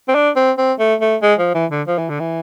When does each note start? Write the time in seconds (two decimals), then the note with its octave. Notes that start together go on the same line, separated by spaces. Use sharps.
0.08 C4
0.15 D4
0.36 C4
0.58 C4
0.79 A3
1.01 A3
1.22 G#3
1.39 F3
1.54 E3
1.71 D3
1.87 F3
1.98 E3
2.09 D3
2.20 E3